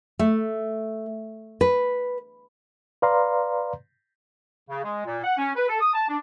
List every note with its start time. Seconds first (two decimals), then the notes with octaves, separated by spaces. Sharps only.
0.19 A3
1.61 B4
3.02 B4 D5 F5 A#5 C6
4.68 C#3
4.83 G#3
5.05 A#2
5.24 F#5
5.38 C#4
5.56 B4
5.68 A4
5.80 D#6
5.93 A5
6.08 D4